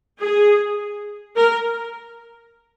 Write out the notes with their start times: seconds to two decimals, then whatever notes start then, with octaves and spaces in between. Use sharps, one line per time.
0.22 G#4
1.37 A#4